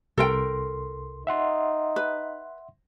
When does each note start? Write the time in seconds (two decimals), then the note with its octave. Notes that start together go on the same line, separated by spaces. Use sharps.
0.18 C2 A4 A#4 G5 C6
1.27 D#4 E5 F#5 C6
1.96 B4